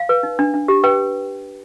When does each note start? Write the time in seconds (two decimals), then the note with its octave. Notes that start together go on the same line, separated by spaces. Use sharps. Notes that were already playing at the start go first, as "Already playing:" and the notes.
Already playing: F5
0.09 B4
0.23 D#4
0.39 D4
0.54 D4
0.68 G4
0.84 B4 G5